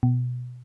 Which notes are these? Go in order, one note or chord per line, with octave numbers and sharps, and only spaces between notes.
B2